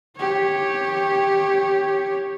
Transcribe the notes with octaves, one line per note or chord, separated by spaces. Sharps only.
G4 C#5